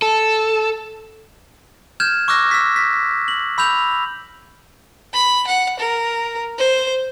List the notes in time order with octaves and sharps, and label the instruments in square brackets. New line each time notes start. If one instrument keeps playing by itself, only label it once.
[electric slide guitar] A4
[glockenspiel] F6 G6 G#6 E7
C#6 D6 E6 F#6 A#6
E6 B6
B6
F#7
B5 E6 G6 F7
[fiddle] B5
F#5
A#4
C5